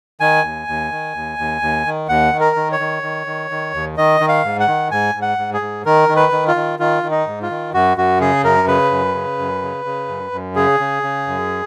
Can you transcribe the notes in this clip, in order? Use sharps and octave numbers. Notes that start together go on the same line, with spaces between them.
D#3 G#5
D#2
D#2
D#3
D#2
D#2
D#2
D#3
D#2 F#5
D#3
A#4
D#3
C#5
D#3
D#3
D#3
D#3
D#2
D#3 D#5
D#3
F5
G#2
F#5
D#3
G#2 G#5
G#2
F#5
G#2
G#4
G#2
D#3 A#4
D#3
B4
D#3
F4
D#3
D#3 F4
D#3
D#4
G#2
F4
D#3
F#2 F#4
F#2 F#4
C#3 G#4
F#2 A#4
C#3 B4
F#2
C#3
F#2
C#3
C#3
F#2
F#2
C#3 G#4
C#3
C#3
F#2